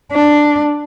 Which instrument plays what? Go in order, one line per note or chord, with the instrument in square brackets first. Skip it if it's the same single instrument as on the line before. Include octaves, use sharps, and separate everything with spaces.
[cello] D4